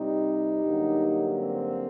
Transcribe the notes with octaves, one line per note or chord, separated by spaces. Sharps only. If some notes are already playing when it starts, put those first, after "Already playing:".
Already playing: C3 G3 C4 D#4 G4
G2 D3 F#3 A#3
C4